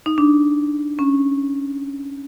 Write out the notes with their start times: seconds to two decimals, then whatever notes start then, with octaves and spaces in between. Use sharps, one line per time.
0.06 D#4
0.18 D4
0.99 C#4